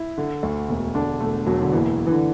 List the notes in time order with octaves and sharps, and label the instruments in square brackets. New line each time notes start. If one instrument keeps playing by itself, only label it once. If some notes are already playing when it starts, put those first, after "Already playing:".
Already playing: [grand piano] E4
D3
D2
E1
[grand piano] D3 [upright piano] D4
[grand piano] E1 [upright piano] A3
[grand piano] E1 [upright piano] F#3
[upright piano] D3
[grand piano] F#1 [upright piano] E3
[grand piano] F#1
[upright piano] E3
D3